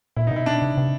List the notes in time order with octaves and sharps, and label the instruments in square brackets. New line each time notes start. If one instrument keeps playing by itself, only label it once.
[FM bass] A#2 [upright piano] E4
[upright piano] D#4
[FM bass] B2
[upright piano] E4
D4
[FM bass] C3
C3